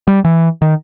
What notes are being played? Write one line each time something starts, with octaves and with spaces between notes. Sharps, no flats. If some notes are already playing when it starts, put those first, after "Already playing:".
G3
E3
D#3